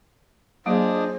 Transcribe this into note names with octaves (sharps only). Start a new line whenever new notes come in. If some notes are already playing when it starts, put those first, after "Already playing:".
F#3 A#3 D4 F4 G#4 C5 D#5